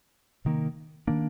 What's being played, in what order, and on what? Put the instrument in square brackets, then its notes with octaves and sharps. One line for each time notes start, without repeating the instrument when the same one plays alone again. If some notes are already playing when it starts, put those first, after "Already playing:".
[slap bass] C3 D#3 A#3
D#3 A#3 D4